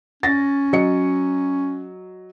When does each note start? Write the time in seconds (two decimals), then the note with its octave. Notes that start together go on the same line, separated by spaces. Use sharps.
0.23 C#4 A6 A#6
0.73 F#3 D#5 C#7